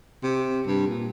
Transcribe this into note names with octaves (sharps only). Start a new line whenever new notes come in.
C3
G2
A#2